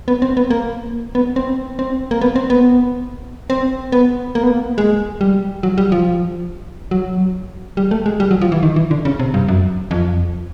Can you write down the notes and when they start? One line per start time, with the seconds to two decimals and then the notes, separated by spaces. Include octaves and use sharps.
0.08 B3
0.22 C4
0.37 B3
0.50 A#3
1.15 B3
1.36 C4
1.79 C4
2.11 A#3
2.21 B3
2.36 C4
2.50 B3
3.50 C4
3.92 B3
4.35 A#3
4.43 B3
4.51 A#3
4.78 G#3
5.21 G3
5.63 F#3
5.78 G3
5.92 F3
6.91 F#3
7.77 G3
7.91 A3
8.06 G#3
8.20 G3
8.31 F#3
8.41 F3
8.52 E3
8.63 D#3
8.76 E3
8.91 D3
9.05 C#3
9.19 C3
9.34 G2
9.48 F#2
9.91 F2